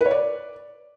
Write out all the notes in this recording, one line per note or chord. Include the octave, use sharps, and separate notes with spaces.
B4
C#5
D5